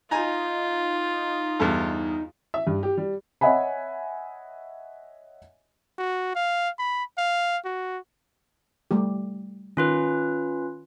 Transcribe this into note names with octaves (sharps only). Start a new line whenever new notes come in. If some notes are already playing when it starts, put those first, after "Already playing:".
D#4 F4 G#5 A#5
E2 G2 A4
E5
G2
G4
G3
C#5 D#5 E5 F#5 G#5 B5
F#4
F5
B5
F5
F#4
G3 A3 G4
D#3 C#4 F4 B4